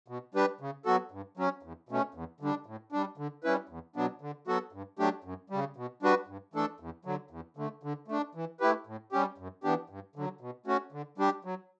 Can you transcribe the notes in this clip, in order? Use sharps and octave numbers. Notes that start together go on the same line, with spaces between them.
B2
G3 D4 G4 B4
C#3
F#3 B3 F#4 A4
G2
F#3 C#4
E2
B2 A3 C#4
E2
D3 G3 D4
A2
G3 D4
D3
G3 C#4 E4 B4
E2
B2 F#3 B3 D4
D3
F#3 B3 F#4 A4
G2
F#3 A3 D4 G4
F#2
C#3 G3
B2
G3 D4 F#4 B4
G2
E3 A3 D4 A4
E2
D3 F#3
E2
D3 A3
D3
A3 D4
E3
A3 E4 G4 B4
A2
G3 C#4 G4
F#2
E3 B3 D4 G4
G2
D3 F#3
B2
A3 C#4 F#4
D3
G3 D4 G4
F#3